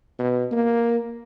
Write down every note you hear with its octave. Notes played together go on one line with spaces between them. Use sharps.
B2
A#3